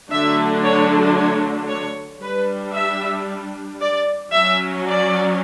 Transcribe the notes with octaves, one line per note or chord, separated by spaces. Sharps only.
D3 F#3 A3 D4 E5
C#5
C#5
C#5
G3 D4 B4
E5
D5
F#3 C#4 E5
D5